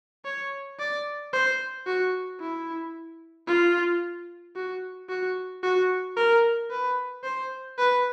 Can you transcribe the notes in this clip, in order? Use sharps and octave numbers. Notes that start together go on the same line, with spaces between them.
C#5
D5
C5
F#4
E4
F4
F#4
F#4
F#4
A#4
B4
C5
B4